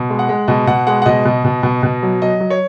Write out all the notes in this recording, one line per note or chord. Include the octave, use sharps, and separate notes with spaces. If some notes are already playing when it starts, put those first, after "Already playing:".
Already playing: B2
G#3
F#5
G#3
B2 D#5
B2 F#5
G#3 F#5
F#5
B2 D#5
B2
B2
B2
B2
F#3
F#3 D#5
F#3
C#5